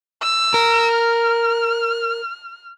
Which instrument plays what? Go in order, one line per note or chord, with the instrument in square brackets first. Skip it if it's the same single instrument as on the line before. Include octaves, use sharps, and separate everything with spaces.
[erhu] E6
[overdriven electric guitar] A#4
[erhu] F6